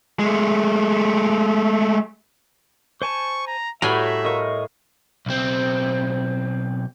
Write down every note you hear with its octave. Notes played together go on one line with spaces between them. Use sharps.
G#3 A3
C5 G#5 A5 C#6
A#5
A2 G3 A3 F#4 E5 G#5 A#5 B5
A#4 C5 D#5 F5 C#6
B1 C4